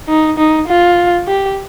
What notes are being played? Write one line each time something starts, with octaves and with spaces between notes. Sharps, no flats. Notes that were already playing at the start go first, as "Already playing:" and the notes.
D#4
D#4
F4
G4